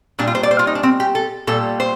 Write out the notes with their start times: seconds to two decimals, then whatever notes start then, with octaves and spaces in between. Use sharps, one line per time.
0.19 A#2 G3 D4
0.27 F4
0.35 C5
0.43 D5
0.51 C5
0.59 F4
0.67 D#4
0.75 D4
0.83 C4
1.00 G4
1.15 A4
1.47 A#2 G3 A4
1.80 C5